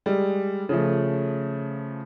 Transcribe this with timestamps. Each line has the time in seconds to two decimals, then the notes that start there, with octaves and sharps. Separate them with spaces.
0.06 G3 G#3
0.69 C#3 F3 A3